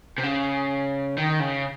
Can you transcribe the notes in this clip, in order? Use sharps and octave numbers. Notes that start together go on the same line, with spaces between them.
C3
C#3
D#3
C#3